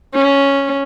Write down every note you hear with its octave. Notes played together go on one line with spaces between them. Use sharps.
C#4